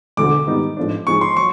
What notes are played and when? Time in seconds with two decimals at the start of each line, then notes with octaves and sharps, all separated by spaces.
0.17 E1 D2 D3 D6
0.47 G#2 D#3 G3 B3 D#4
0.77 A1 G#2 F3 A3 D4
1.07 G#2 F3 G#3 C#6
1.21 C6
1.37 F#3 C#6